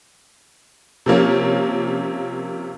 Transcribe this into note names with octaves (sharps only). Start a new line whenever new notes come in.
C3 F3 A#3 C#4